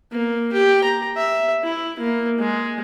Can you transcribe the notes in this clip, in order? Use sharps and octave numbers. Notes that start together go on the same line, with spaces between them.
A#3
G4
A#5
E5
E4
A#3
G#3